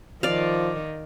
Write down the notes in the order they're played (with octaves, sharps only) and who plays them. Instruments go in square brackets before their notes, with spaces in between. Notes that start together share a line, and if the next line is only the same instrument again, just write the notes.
[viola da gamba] D#3 [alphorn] F3 [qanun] D5 F5